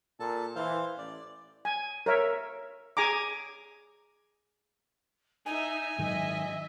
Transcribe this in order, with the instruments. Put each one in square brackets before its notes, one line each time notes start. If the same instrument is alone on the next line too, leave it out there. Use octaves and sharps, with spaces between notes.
[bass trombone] A#2 [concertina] A4 A5
[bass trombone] E3 [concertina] C5 F5
[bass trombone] A1 [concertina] D5
[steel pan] G#5
A#4 C#5 E5
G#4 G#5 A#5 D6
[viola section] D#4 E5 [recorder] G#5
[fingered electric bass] G#2 D#3 F#3 [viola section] D#5 E5